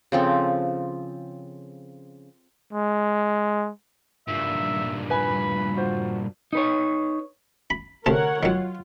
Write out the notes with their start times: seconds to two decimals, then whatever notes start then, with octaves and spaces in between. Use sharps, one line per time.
0.12 C#3 F3 C4 A4
2.73 G#3
4.28 G2 A#2 E5
5.10 B4 G#5 B5
5.77 F4 F#4 C5
6.53 D#4 B4 C#5
7.70 B5
8.06 D2 C3 A#4 C#5 F#5 A5
8.43 D#3 F#3 F4